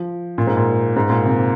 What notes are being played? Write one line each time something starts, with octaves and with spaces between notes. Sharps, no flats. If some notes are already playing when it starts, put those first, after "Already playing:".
Already playing: F3
A#2
G#2
A#2
G#2
A#2
C3